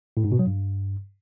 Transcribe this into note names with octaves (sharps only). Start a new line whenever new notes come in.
A2
G#2
B2
F#3
G2